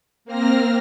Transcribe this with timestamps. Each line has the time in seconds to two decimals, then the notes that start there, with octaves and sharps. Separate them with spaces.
0.25 A#3 C4 F6 A#6